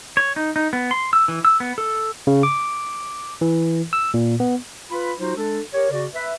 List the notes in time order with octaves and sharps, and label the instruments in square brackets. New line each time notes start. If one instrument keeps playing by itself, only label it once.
[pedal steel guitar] C#5
D#4
D#4
B3
C6
E6
E3
E6
B3
A4
[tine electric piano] C#3
D6
E3
E6
A#2
B3
[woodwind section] F4 B4 B5
F#3 D#4 F4 F#4 C5
G#3 D4 A4
G4 A#4 C#5
C#3 F#4 D5
B4 E5